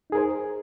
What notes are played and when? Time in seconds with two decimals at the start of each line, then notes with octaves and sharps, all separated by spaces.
0.10 D#4
0.12 G#4
0.15 A#4
0.17 C5